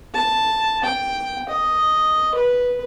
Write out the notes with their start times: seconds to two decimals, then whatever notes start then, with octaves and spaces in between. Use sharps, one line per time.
0.14 A5
0.84 G5
1.49 D#5
2.35 B4